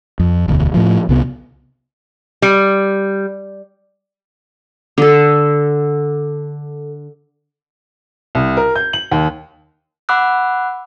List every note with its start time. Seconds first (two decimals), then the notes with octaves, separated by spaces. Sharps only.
0.19 F2
0.48 E1 D2
0.74 A2 F3
1.09 C2 C3 B3
2.42 G3
4.98 D3 A4
8.35 C2
8.57 A#4
8.75 G6
8.93 F#7
9.12 D#2
10.09 F#5 B5 D6 E6 F#6